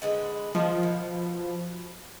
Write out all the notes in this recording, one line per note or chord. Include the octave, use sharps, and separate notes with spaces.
D3 G#3 B4
D#3 F3
B2